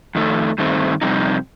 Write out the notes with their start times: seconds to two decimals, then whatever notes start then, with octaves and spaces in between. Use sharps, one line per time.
0.15 F2 D#3 A3
0.58 G2 D#3 A3 C4
1.01 F2 C3 G3 C4 D#4